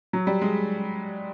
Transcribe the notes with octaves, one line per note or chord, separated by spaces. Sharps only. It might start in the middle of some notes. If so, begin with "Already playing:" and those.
F#3
G3
G#3